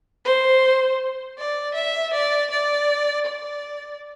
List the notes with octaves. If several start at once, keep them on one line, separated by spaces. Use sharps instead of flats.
C5
D5
E5
D5
D5
D5